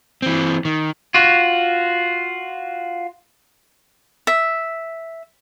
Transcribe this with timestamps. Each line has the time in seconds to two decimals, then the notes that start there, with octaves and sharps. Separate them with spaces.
0.22 E3 C4
0.65 D#3
1.14 F4 F#4
4.27 E5